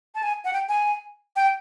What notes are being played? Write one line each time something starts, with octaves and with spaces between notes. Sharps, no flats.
A5
G#5
F#5
G5
G#5
G5